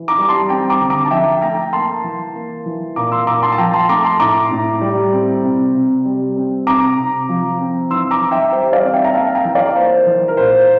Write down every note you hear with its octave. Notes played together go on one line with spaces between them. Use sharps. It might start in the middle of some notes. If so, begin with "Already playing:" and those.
Already playing: E3
A#5 D6
G3 D6
A5 C6
C4 G5 A#5
A#5 D6
D3
A#5 D6
A5
F3 E5 G5
A3 G5 A#5
A#3 A5 C6
E3
A#3
E3
A#2 A#5 D6
C6 E6
A#2 A#5 D6
A5 C6
A5
F3 G5 A#5
A5 C6
A3 A#5 D6
A5 C6
A2 A#5 D6
A2
G3
C4
C3
C3
G3
C4
C3 A#5 D6
C3
F3
C4
E3 C6 E6
A#5 D6
E3
E5 G5
G3 C5
D5 F5
C4
E5 G5
A#5
A#3 F5 A5
G5 A#5
E3
D5 F5
A#3 C5
E3
A#4
A#2 C5